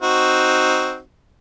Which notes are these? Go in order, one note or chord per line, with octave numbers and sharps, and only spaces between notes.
C4 D#4 F#4